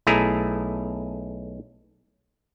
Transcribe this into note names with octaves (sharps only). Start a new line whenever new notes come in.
B1 A3 E4 G#4 A#5